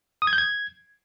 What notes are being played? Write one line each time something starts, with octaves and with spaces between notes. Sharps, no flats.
D#6
G#6
G6
G#6